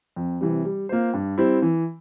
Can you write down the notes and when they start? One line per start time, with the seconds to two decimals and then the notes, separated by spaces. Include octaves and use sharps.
0.16 F2
0.41 C3 E3 G3
0.65 G3
0.89 A#3 F4 C5
1.14 G2
1.38 G3 C4 E4
1.62 E3